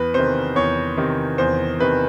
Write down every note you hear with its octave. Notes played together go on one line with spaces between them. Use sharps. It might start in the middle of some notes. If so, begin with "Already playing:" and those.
Already playing: E2 B4
C3 D#3 C5
E2 C#5
C3 D#3
E2 C5
C3 D#3 B4